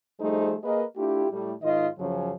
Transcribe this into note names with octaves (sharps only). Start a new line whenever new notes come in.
F3 G3 A3 D#4 G#4 C5
A#3 G#4 A#4 B4 D#5
A3 D4 E4 F4 G4
A2 G3
G#2 D#3 F4 D#5
F#2 C#3 F3 F#3 C#4 G#4